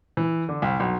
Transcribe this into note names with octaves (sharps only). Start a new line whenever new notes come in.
E3
D3
C2
B1